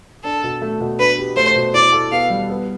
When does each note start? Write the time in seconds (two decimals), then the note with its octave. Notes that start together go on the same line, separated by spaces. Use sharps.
0.24 D4 A4
0.43 B2
0.62 A3
0.80 B2
0.99 D4 B4
1.18 G4
1.36 A3 C5
1.56 B2
1.74 E4 D5
1.93 A4
2.12 B3 F5
2.30 G3
2.50 B3